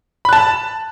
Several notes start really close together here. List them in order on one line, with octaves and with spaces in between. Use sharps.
B5 F#6 A5